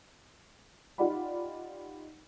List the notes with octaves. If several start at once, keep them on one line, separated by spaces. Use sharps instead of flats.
D#4 F4 G4 D5 F#5 B5